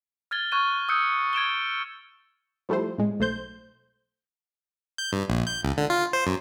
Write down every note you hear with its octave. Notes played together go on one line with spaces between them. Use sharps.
F6 G#6 A6 G7
C#6 F6 F#6 G#6 D#7
D#6 E6 F#6 G6 C#7
G#6 D7 E7 G7
F3 G3 A3 E4 C5
A2 G#3
B1 A3 C5 G6
G6
G2
A#1
G6
C#2
D3
F4
C5
F#2